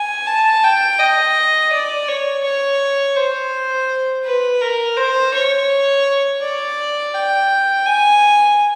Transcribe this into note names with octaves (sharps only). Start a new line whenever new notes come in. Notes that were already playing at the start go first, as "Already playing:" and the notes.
Already playing: G#5
A5
G5
D#5
D5
C#5
C#5
C5
B4
A#4
C5
C#5
D5
G5
G#5